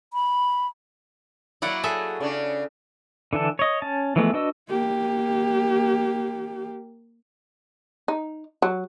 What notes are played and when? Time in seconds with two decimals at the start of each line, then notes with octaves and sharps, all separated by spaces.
0.13 B5
1.62 F#3 A#3 E4 D5 F#5
1.84 G#4 A4 E5
2.20 C#3 D4
3.33 D3 E3 D4 A4
3.59 C#5 D#5
3.82 C#4 A5
4.16 E3 F3 G#3 A3 B3
4.34 D4 F#4 B4 D#5 E6
4.69 A#3 G4
8.08 D#4
8.62 F#3